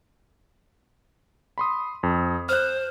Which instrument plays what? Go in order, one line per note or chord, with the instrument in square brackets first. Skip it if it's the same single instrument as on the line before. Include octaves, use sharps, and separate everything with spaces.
[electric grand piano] B5 C6 D#6
F2
[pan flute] C5 [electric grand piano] F6 F#6